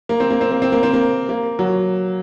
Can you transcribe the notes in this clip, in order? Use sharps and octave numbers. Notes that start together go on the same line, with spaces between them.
A#3
C4
A#3
C4
A#3
C4
A#3
C4
A#3
A#3
F#3